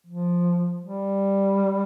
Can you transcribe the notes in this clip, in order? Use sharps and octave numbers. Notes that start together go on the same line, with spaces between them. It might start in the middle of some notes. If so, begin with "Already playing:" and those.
F3
G3